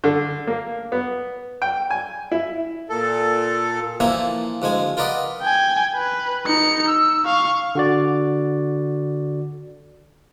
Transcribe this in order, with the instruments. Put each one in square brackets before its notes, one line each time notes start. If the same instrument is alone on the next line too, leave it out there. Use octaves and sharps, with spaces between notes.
[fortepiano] D3
A#3
B3
G5
G#5
E4
[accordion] A#2 A4
[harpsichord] A#2 E3 F3 A#3 E5 G#5
D2 F3 G#3 G#5
F4 A#4 B4 D5 D#5 F#5
[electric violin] G5 G#5
B4
D#4 C#7
E6
F5 C#6
[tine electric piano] D3 F#4 D5